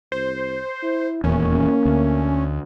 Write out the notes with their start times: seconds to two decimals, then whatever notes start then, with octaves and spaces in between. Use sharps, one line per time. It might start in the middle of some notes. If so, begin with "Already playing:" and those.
0.12 C2 C5
0.83 E4
1.24 D#1 E2 A#3 C#4
1.85 D2